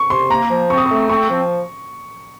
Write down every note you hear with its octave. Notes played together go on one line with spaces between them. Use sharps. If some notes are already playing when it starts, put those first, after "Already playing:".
Already playing: C#6
C3 C6
A#3 A#5
F3
C4 C#6
D#6
C#6
A3
C4 C#6
F3